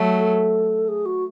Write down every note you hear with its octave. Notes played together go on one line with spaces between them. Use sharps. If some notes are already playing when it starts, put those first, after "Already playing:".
Already playing: F#3 A3
A4
G#4
F#4